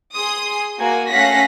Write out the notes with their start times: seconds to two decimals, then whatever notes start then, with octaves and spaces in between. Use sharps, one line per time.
0.14 G#4 C6 D#6
0.79 A#3 F#4 G#5
1.10 A3 C#4 F5 F#5 A#6 B6